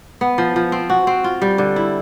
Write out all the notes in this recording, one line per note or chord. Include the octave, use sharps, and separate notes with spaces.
B3
F3
F3
C4
F#4
C4
F4
G3
D3
E4